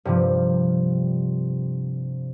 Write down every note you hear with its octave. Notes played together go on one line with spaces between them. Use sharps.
G2 C3 F3